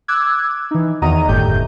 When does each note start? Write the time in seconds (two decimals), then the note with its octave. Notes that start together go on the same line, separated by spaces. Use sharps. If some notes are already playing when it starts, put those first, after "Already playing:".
0.08 D6 E6 F#6 G#6
0.71 E3 D#4
1.02 E2 D#3 F#4 D#5 A#5 D#7
1.28 G1 F#2 A2 A3 G4 G6